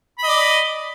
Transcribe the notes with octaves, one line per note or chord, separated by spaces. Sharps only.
D5 D#5 B5